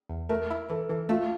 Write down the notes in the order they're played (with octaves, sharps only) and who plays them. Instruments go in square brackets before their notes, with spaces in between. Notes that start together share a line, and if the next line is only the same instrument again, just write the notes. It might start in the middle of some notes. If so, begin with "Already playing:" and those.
[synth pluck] E2
[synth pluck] A3 [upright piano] A#4
[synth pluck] E4
[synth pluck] E3 [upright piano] A4
[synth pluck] E3 [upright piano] A4
[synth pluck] A3 [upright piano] F4